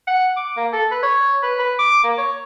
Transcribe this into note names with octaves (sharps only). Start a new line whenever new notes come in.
F#5
D6
A#3
A4
B4
C#5
B4
B4
D6
A#3
C#5